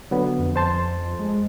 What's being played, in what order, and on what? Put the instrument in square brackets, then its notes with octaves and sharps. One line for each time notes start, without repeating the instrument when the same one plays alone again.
[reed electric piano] D3 F#3 B3
[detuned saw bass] F2
[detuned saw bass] F2 [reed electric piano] C5 A5 C6
[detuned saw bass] G#3